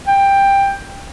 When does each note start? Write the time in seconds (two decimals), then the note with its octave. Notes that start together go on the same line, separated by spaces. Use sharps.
0.07 G5